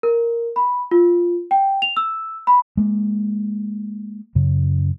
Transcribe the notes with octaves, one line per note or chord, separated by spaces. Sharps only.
A#4
B5
F4
G5
F7
E6
B5
G#3 A#3
F#2 C#3